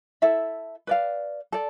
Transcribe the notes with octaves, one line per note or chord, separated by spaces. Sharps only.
E4 A4 E5
B4 D5 F5
A4 D5